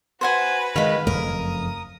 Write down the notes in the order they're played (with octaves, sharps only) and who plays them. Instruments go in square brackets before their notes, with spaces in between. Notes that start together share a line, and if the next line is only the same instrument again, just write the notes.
[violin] F#4 B4 [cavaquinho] C5 F#5 G#5
[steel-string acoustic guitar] D#3 G#3 [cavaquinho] F5 B5
[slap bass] F#1 F2 A3 [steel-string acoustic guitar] A#4 [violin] D#6